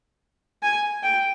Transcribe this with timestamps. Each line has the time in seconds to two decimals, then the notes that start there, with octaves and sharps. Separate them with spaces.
0.63 G#5
1.03 G5